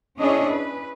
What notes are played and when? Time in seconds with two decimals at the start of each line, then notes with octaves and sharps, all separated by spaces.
0.18 C#4 D4 E4 G#4 C#5 D#5
0.48 B4